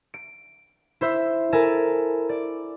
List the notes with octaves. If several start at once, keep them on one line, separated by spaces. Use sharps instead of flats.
D7
E4 C5 E5
E4 A4 A#4 G#5 A5
D5